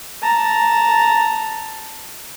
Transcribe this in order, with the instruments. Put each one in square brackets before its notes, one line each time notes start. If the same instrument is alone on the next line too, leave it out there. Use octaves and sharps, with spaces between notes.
[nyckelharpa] A5 A#5